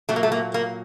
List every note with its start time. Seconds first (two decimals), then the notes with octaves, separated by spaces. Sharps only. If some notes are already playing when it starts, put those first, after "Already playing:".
0.09 A#2 F#3 A3
0.16 A#3
0.23 A3
0.32 A#3
0.54 A#3